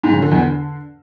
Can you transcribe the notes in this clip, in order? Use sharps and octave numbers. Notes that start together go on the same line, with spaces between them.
G#2
C#3
D3
E2
D3